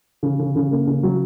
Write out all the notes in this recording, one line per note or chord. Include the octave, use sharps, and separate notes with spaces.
C#3
C#3
C#3
A#3
C#3
F#3